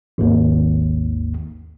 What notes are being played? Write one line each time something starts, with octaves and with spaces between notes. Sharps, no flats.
G#1 D#2